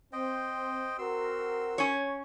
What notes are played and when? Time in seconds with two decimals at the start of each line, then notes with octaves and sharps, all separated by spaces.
0.13 C4 C5 D#5 G5
0.98 C4 F#4 A#4 C6 E6
1.78 C#4 C#5